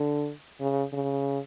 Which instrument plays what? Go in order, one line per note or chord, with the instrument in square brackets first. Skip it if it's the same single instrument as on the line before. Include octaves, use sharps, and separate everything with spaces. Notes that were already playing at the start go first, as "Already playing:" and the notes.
Already playing: [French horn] D3
C#3
C#3